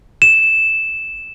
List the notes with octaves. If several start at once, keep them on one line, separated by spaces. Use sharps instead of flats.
E7